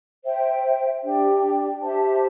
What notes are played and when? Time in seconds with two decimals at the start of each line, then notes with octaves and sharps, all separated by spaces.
0.24 C5 E5 G5
1.03 D4 G4 D5 G5
1.82 G4 C5 E5 A5